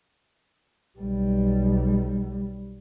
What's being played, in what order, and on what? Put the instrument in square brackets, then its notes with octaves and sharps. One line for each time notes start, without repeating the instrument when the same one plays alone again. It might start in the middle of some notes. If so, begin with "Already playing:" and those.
[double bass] B1 G3